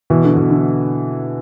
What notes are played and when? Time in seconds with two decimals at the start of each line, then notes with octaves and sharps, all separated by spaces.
0.10 B2 E3
0.24 D3
0.37 B2
0.50 D3